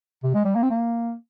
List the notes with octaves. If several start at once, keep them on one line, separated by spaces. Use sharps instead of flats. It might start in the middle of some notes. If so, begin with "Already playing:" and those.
C3
G#3
G3
A#3
C4
A#3